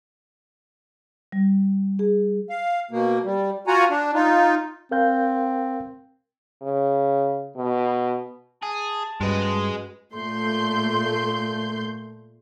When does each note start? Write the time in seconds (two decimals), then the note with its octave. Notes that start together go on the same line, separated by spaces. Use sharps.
1.32 G3
1.99 G#4
2.50 F5
2.91 B2 A#3
3.25 G3
3.67 F4 F#4 F#5 G#5 A#5
3.90 D4
4.14 D#4 F4
4.91 C4 A#4 F5 G6
6.62 C#3
7.57 B2
8.63 G#4 A5
9.21 G2 G#3 C#4 F#4 B4 D#5
10.13 A#2 A3 C6 G6